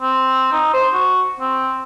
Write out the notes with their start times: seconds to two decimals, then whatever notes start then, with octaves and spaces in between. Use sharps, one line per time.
0.01 C4
0.53 D#4
0.74 C5
0.93 F#4
1.40 C4